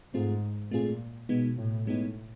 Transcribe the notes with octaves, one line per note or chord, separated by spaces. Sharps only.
G#2 A3 C4 F4 G#4
A#2 A3 C4 F4 G#4
B2 G#3 B3 D#4
A2
A2 G#3 B3 D#4